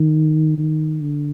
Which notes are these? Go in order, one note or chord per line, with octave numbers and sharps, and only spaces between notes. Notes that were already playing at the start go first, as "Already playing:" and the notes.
Already playing: D#3
D#3
D3